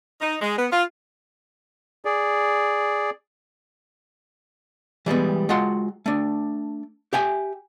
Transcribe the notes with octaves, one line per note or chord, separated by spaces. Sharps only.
D#4
G#3
B3
F4
G#4 D5
E3 G3 G#3 B3
G#3 F4 F#4 F#5 C6
A3 D4
G4 E5 G5 G#5